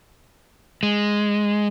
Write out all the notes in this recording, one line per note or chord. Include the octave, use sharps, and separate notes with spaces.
G#3